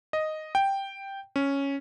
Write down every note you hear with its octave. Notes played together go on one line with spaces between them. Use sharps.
D#5
G5
C#4